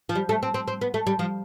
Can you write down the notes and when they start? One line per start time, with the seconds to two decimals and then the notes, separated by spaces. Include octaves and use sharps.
0.09 F3
0.15 G3
0.29 A3
0.43 C4
0.54 C4
0.68 C4
0.81 B3
0.94 A3
1.07 G3
1.19 F3